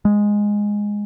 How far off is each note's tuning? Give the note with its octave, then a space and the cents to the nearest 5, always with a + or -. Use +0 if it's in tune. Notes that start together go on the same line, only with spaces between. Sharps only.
G#3 -5